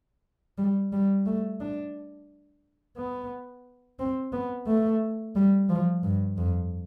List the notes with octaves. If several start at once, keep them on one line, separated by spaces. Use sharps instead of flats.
G3
G3
A3
D4
B3
C4
B3
A3
G3
F3
G2
F2